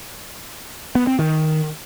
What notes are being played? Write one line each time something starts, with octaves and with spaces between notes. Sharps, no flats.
B3
C4
D#3